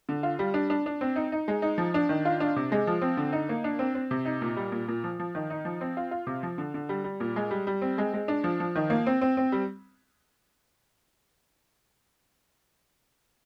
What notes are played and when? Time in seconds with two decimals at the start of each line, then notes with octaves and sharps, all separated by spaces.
0.09 D3
0.23 F4
0.39 G3
0.54 D4
0.70 D4
0.86 D4
1.01 C4
1.16 D#4
1.32 D#4
1.48 G#3
1.62 D#4
1.78 F3
1.94 D4
2.09 D#3
2.25 F4
2.40 D4
2.56 C3
2.72 G#3
2.87 F3
3.02 C4
3.17 D3
3.33 D#4
3.49 A#3
3.64 D4
3.79 C4
3.95 C4
4.11 C3
4.25 D#4
4.41 A#2
4.56 G3
4.72 A#2
4.88 A#2
5.04 F3
5.19 F3
5.35 D#3
5.50 D#4
5.65 F3
5.81 C4
5.97 F4
6.11 F4
6.27 C3
6.43 F3
6.58 D3
6.74 D3
6.89 G3
7.04 G3
7.20 A#2
7.36 G#3
7.51 G3
7.67 G3
7.82 C4
7.98 G#3
8.14 G#3
8.28 D4
8.44 F3
8.60 F3
8.76 D#3
8.90 A#3
9.06 C4
9.21 C4
9.37 C4
9.52 G3